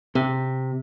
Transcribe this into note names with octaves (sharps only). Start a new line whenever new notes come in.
C3